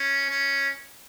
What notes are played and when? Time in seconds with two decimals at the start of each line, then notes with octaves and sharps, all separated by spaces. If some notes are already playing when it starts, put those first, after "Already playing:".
Already playing: C#4
0.29 C#4